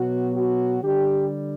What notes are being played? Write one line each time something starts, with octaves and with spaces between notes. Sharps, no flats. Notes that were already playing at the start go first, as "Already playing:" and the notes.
Already playing: B2 F#3 F#4
F#4
D3 G3 G4